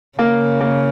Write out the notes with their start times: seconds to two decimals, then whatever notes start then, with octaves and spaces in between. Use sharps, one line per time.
0.19 C#3 A#3
0.61 A#3